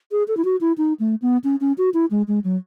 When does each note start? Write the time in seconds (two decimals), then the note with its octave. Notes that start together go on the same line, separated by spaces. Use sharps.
0.11 G#4
0.28 A4
0.37 E4
0.45 F#4
0.61 E4
0.78 D#4
0.99 A3
1.22 B3
1.44 C#4
1.61 C#4
1.78 F#4
1.94 E4
2.11 G#3
2.28 G#3
2.44 F#3